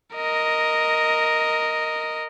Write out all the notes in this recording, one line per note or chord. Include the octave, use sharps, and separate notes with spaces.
A#4 D#5